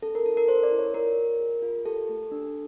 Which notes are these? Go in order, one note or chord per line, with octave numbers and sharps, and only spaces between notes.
C#4 A4
A#4
E4 A4
A#4
C#4 C5
D5
E4
C#5
F4 A#4
F4
G#4
F4
G4 A4
A3
D4